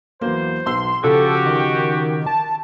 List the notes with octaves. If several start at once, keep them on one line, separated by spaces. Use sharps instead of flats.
E2 F#3 A#3 C5
B1 C6 E6
C#3 F3 F#4 G4 A4
D#3
A5